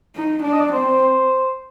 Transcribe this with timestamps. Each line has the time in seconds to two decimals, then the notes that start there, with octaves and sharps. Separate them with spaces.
0.16 D#4
0.43 D4 D5
0.52 D#5
0.60 D5
0.73 C4 C5